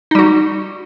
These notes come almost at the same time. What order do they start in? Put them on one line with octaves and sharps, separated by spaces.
D#4 G3 F#4